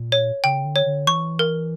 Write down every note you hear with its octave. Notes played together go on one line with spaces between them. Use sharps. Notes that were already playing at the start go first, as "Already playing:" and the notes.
Already playing: A#2
C#5
C#3 G5
D3
C#5
D3
E3 C#6
A#4